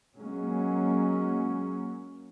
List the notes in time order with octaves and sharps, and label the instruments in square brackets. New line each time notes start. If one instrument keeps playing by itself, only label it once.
[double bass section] F#3 A#3 C#4 [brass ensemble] G#3